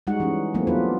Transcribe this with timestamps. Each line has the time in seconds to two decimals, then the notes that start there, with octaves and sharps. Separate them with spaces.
0.07 G3 G#3 D#4 F#4 F#5
0.20 E3 C#4
0.54 E3 F#3 G3 A3 A#3 C4
0.67 B3 D4 F4 B4